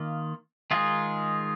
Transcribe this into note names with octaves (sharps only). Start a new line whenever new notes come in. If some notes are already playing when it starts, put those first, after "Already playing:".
Already playing: D#3 A#3 F4
D#3 G#3 D#4 F4 G#4